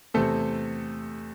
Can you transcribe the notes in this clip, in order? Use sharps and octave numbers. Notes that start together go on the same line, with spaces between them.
E2 C3 A3 C4 A4